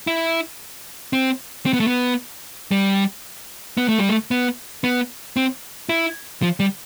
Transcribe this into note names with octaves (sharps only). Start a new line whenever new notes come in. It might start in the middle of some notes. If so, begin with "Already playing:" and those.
E4
C4
C4
B3
A3
B3
G3
B3
A3
G3
A3
B3
B3
C4
E4
F3
G3